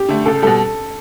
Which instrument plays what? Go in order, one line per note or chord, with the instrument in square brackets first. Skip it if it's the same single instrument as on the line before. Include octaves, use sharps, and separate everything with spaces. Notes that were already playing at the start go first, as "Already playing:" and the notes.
Already playing: [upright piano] G4
[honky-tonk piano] D3 A3
[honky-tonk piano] C#2 [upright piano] A4
[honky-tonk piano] B2 G3 [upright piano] A4